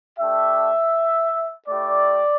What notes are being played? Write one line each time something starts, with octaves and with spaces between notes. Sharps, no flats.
A3 D4 G4 E5
A3 E4 G4 D5